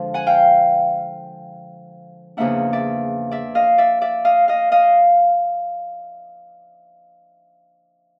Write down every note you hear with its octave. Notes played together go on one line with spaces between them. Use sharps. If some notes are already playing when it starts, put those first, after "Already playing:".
Already playing: D3 F3 G#3 D4
F#5 G#5
F5 G5
E2 C#3 F3 A#3 D4 E5 F#5
D5 E5
D5 E5
D#5 F5
D5 E5
D5 E5
D#5 F5
D#5 F5
D#5 F5